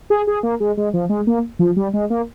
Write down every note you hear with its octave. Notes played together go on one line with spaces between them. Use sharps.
G#4
G#4
A#3
G#3
G#3
F3
G#3
A#3
F3
G3
G#3
A#3